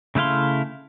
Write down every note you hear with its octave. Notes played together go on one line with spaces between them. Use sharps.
C#3 A3 E4 F5 C6